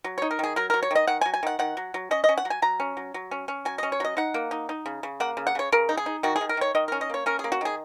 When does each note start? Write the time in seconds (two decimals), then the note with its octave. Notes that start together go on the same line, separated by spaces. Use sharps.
0.04 F#3
0.18 C#5
0.22 D#4
0.31 A#4
0.39 D#3 G#4
0.56 F#3 A#4
0.70 F#3 A#4
0.83 C#5
0.91 D#3 D#5
1.07 D#3 F#5
1.21 G#5
1.25 F#3
1.34 G#5
1.43 D#3 F#5
1.59 D#3 F#5
1.77 F#3
1.94 F#3
2.11 C#4 D#5
2.24 D#5
2.29 C#4
2.38 F#5
2.45 F#3
2.50 G#5
2.62 F#3 A#5
2.80 C#4
2.97 F#3
3.14 F#3
3.31 C#4
3.48 C#4
3.65 F#3 G#5
3.78 D#5
3.83 C#4
3.92 C#5
4.00 F#3 D#5
4.17 D#4 F#5
4.34 A#3
4.51 D#4
4.69 D#4
4.86 C#3
5.03 C#3
5.20 A#3 F#5
5.37 C#3
5.47 F#5
5.55 C#3 C#5
5.72 C#3 A#4
5.89 D#4
5.97 G#4
6.06 D#4
6.23 D#3 F#4
6.36 G#4
6.41 D#3
6.49 A#4
6.57 D#3 C#5
6.75 D#3 D#5
6.88 A#4
6.92 C#4
7.01 D#5
7.10 A#3 C#5
7.26 C#4 A#4
7.39 G#4
7.44 A#3
7.52 F#4
7.61 D#3 G#4